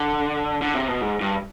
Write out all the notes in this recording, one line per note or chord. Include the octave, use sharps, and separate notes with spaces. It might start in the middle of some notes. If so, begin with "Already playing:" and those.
Already playing: D3
D3
C3
B2
G#2
G2